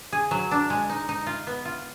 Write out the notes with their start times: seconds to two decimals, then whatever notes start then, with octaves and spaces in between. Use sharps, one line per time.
0.13 G#4
0.31 F#3
0.51 D4
0.70 G#3
0.90 D#4
1.09 D#4
1.27 F4
1.47 B3
1.65 F4